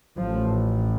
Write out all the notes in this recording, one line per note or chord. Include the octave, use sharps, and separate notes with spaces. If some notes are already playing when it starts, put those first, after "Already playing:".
A1 A2 F3